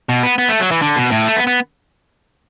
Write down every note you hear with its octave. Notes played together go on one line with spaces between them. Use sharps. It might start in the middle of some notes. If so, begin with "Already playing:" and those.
B2
B3
B3
A3
F#3
E3
D3
B2
A2
A3
B3
B3